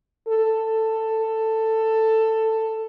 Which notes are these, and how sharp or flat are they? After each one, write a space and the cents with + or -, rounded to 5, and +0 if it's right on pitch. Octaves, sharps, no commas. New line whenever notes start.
A4 +10